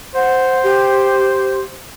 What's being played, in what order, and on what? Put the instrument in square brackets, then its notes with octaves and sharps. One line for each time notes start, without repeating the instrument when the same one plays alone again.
[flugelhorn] C5 [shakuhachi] F#5
[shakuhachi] G4